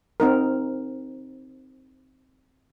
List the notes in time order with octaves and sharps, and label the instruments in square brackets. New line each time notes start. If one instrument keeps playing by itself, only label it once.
[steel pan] C4 D#4 A#4